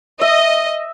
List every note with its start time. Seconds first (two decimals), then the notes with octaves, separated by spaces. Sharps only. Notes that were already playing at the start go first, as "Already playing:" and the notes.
0.21 D#5 E5